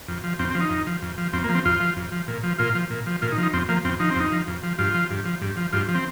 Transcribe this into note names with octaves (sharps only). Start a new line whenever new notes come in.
F2
F3
F2 C4
C4
F3
D#4
F2
F3
F2
F3
F2 C4
A#3
F3
C4
F2 F4
F3
F2
F3
A#2
F3
A#2 F4
F3
A#2
F3
A#2 F4
D#4
F3
D#4
F2 C4
F3 A#3
F2 C4
F3 D#4
C4
F2 D#4
F3
F2
F3
G2 F4
F3
G2
F3
G2
F3
G2 F4
F3
C4